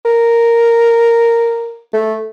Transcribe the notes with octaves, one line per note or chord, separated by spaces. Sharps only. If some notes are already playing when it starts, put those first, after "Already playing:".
A#4
A3